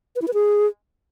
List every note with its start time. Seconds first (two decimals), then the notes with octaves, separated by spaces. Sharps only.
0.16 B4
0.22 E4
0.28 B4
0.34 G#4